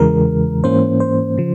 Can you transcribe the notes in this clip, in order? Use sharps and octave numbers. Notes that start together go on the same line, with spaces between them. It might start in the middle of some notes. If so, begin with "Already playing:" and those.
Already playing: E2 C#3 E3 G#3 A#4
G#2 E3 A#3 C#4 C5
C5
C#3 F3